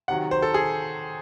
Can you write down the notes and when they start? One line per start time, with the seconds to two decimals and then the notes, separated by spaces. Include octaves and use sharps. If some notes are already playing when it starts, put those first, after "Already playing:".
0.08 C3 D#3 F#3 F#5
0.31 C5
0.42 A4
0.54 G#4